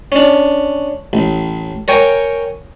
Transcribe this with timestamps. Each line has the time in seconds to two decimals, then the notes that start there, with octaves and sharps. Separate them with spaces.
0.12 C#4 D4
1.13 A1
1.88 A#4 C#5 G5 G#5